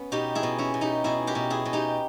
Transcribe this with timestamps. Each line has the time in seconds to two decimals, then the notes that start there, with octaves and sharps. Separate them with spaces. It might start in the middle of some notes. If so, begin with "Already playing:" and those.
Already playing: B3 C#4
0.12 B2 D#4 G4
0.35 E4 G#4
0.43 B2
0.58 C#4 E4
0.74 B2
0.81 D#4 G4
1.04 B2 E4 G#4
1.27 G4 A#4
1.35 B2
1.50 E4 G#4
1.65 B2
1.73 D#4 G4